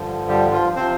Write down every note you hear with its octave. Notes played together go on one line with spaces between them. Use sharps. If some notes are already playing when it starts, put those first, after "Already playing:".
Already playing: G2 D3 F3
G3 G4
F3 F4
C3 F3 C4 C5